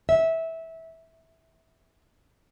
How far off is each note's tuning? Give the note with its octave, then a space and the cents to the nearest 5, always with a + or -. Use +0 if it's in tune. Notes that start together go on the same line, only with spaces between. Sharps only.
E5 -15